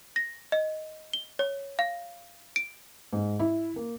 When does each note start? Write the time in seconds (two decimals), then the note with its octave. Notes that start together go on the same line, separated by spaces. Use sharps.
0.16 A#6
0.52 D#5
1.13 G7
1.39 C#5
1.79 F5
2.56 D7
3.13 G#2
3.39 E4
3.76 A#3